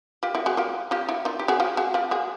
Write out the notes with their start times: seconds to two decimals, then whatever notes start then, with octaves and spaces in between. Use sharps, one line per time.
0.23 F4 G4
0.35 E4 F#4
0.46 F#4 G#4
0.57 F4 G4
0.91 F4 G4
1.09 E4 F#4
1.25 D#4 F4
1.39 G4
1.48 F#4 G#4
1.60 F4 G4
1.77 F#4 G#4
1.94 F4 G4
2.11 F#4 G#4